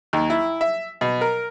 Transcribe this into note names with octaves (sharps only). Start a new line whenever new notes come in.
D#2
E4
E5
B2
A#4